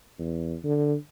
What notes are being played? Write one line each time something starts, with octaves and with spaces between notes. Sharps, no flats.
E2
D3